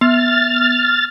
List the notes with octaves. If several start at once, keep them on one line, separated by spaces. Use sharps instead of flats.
B3 F6 A6